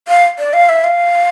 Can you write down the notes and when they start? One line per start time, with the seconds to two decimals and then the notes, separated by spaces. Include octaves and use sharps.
0.08 F5
0.39 D5
0.53 F5
0.69 E5
0.84 F5